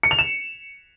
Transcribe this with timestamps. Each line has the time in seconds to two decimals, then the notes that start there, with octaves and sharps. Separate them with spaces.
0.03 C#7
0.11 F7
0.19 E7